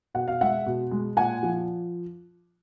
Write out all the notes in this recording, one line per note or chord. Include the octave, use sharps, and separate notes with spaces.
B2 F#5
F5
G#3 E5 F#5
B2
G#3
A#2 F#5 G#5
F3